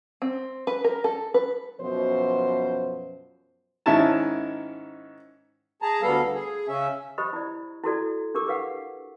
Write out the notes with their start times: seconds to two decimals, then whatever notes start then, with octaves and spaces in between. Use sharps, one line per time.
0.22 C4
0.67 B4
0.84 A#4
1.04 A4
1.34 B4
1.81 F#2 B2 F3 C5
3.86 G#2 D#3 C#4 E4 A5
5.82 G#4 A5 A#5
6.02 D2 G3 B3 A4 F5
6.34 G#4
6.68 C#3 C#4 E5
7.18 G4 C5 D#5 B5 D#6
7.33 E4 D5
7.84 E4 F#4 A4 D5
8.35 D4 G4 A#4 D6
8.47 G4 B4 F5 F#5